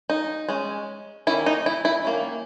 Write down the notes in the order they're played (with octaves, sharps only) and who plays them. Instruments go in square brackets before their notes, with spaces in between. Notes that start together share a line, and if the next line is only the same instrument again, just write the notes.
[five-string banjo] D#4
G#3 C#4
D#3 A#3 C#4 E4
D#4
E4
E4
D#3 A#3 C#4